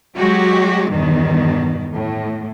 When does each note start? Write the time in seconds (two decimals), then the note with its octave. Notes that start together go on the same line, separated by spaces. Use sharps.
0.16 F#3 G#3 F#4 G4
0.90 E2 G2 B2 D#3
1.94 A2